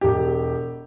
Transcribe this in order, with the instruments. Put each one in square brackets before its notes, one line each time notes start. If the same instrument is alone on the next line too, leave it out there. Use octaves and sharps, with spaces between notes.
[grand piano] E1 G4